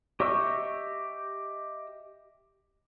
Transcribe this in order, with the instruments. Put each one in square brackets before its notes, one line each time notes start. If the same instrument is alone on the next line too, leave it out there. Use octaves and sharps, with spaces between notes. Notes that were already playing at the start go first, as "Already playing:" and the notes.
[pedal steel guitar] G4 D#5 E5 C#6 E6